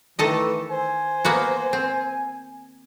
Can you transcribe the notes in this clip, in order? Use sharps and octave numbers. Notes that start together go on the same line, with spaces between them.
D#3 E3 A3 A4 D#5
C5 G#5
A#3 B3 F#4
C4